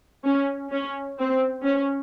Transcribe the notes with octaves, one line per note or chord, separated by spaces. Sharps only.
C#4
C#4
C4
C#4